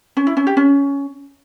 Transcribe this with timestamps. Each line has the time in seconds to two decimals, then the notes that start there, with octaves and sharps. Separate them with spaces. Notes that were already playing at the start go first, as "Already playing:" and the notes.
0.17 C#4
0.27 E4
0.37 C#4
0.47 G4
0.57 C#4